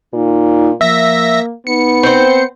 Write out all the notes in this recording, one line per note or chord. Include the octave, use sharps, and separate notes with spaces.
A#2 D#4
F3 A#3 E5 A#6
B3 D#4 C#7
C4 C5